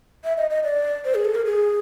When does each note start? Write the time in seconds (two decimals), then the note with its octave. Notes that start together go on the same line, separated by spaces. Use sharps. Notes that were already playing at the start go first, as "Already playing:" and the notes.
0.24 E5
0.37 D#5
0.50 D#5
0.64 D5
1.05 C5
1.15 G#4
1.25 A4
1.35 A#4
1.45 G#4